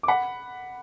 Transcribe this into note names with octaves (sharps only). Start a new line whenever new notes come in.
D6
F#5 B5